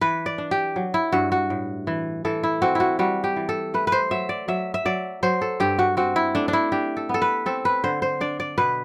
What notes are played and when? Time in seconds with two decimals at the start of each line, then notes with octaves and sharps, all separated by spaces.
0.01 E3 B4
0.26 D5
0.38 D4
0.51 G4
0.76 F#3
0.94 E4
1.12 G2 F#4
1.32 F#4
1.50 A2
1.87 E3
2.25 E3 A4
2.43 E4
2.62 C4 F#4
2.75 E4 F#4
2.99 G3 F#4
3.24 G4
3.36 E3
3.49 A4
3.74 A3 B4
3.87 B4
3.92 C5
4.11 F#3 E5
4.29 D5
4.48 F#3 E5
4.74 E5
4.85 F#3 D5
5.23 F#3 C5
5.41 A4
5.60 G2 G4
5.79 F#4
5.97 C4 F#4
6.16 E4
6.35 A3 D4
6.48 D4
6.53 E4
6.72 D4 G4
6.97 A4
7.09 B3 A4
7.22 B4
7.46 C4 A4
7.65 B4
7.84 D3 C5
8.02 C5
8.21 D4 D5
8.40 D5
8.58 B2 B4